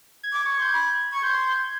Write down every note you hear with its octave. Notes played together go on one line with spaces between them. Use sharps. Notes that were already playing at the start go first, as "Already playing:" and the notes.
G#6
D6
C#6
G#6
C6 G6
B5 G#6
C#6 G#6
C6 G6